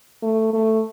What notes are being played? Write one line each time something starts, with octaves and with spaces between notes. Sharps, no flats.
A3
A3